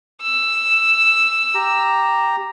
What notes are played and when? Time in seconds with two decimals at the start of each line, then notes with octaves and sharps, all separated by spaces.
0.21 E6
1.55 G4 A#5